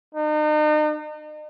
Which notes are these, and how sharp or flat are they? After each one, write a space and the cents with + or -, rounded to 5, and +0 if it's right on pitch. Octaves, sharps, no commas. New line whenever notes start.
D#4 -40